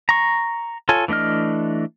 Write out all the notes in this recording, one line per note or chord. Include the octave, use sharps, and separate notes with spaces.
A#5 C#6
F4 A4 C#5 G#5
E3 A3 D4 D#5 F6